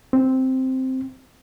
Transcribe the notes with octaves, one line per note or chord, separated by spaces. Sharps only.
C4